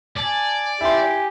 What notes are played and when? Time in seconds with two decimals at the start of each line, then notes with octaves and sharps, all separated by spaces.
0.17 D5 G#5 A5
0.81 E4 G4 G#5 C6